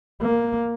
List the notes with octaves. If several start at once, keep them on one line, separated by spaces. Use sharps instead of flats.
A#3